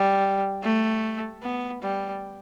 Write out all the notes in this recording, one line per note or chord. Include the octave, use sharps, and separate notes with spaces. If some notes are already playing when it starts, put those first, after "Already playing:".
Already playing: G3
A3
B3
G3